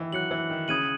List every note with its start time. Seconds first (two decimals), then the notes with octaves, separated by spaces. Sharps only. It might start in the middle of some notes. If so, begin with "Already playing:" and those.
Already playing: D#3 E3
0.13 F#3 F#6 C#7 F#7
0.31 E3
0.50 D#3
0.68 C#3 D#6 G#6 D#7 F#7